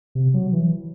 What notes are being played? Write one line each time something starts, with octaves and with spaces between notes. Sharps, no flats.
C3
F#3
E3